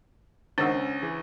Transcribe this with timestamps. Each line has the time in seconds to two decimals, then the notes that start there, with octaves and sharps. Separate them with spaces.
0.58 C#2 D#3 D4 C5 F#5 E6
0.75 C#4
1.02 E3 G#4